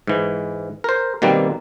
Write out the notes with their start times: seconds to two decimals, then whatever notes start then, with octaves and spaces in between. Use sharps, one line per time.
0.07 G#2 E3
0.84 A#4 C5
1.22 B2 D#3 G3 A#3 C4